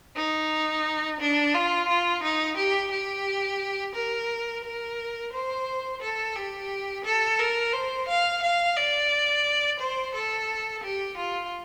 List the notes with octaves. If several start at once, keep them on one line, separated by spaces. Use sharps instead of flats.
D#4
D4
F4
F4
D#4
G4
G4
A#4
A#4
C5
A4
G4
A4
A#4
C5
F5
F5
D5
C5
A4
G4
F4